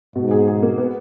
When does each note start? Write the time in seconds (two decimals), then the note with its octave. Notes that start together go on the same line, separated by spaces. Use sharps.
0.15 G#2 B2
0.31 G#4
0.48 G#4
0.63 A#3
0.78 B3